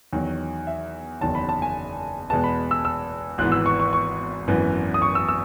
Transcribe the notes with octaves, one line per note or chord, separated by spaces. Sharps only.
E2 D#3 F#3
E5
F#1 E2 D#3 F#3 A5
B5
A5
G#5
E2 B2 G#3 B3 A5
B5
E6
E6
G#1 G#2 E3 B3 F#6
E6
C#6
C#6
C#6
G#1 F#2 E3 B3
D#6
C#6
E6
E6